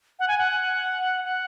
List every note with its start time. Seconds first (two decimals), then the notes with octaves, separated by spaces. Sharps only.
0.19 F#5
0.28 G#5
0.38 F#5
1.24 F#5